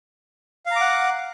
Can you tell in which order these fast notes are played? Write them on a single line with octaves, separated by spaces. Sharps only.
F5 A#5 D6 F#5